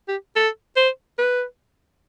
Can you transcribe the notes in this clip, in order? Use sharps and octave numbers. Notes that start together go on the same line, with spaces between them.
G4
A4
C5
B4